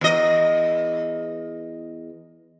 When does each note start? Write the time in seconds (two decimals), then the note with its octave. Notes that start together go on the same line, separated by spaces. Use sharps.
0.01 E2 D#5